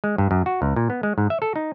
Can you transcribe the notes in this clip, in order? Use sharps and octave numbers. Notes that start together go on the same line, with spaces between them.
G#3
G2
F#2
F#4
C#2
A#2
B3
G#3
G#2
E5
A4
D#4